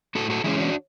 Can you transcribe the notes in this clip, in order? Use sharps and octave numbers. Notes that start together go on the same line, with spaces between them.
A2 F#4 A4
F#4 A4
E3 G#3 C#4 E4 G#4
D4 F#4